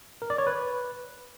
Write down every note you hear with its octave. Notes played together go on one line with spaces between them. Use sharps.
A#4
D5
C#5
B4